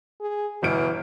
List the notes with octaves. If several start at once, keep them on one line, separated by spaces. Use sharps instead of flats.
G#4
G1 B2 E3 F6 D7